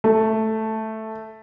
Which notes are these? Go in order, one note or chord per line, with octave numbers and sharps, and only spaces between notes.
A3